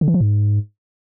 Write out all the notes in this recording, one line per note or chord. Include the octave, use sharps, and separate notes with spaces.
D3
E3
F3
G#2